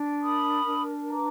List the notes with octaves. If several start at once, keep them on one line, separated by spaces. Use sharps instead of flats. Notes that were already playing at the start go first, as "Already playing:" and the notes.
Already playing: D4
A#4 B5 D#6
D4
B4 A#5 D6